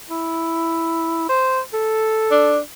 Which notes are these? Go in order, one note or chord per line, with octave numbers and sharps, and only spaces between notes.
E4
C5
A4
D4